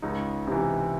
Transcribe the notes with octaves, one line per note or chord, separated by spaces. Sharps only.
C#2 D#4
C3 E3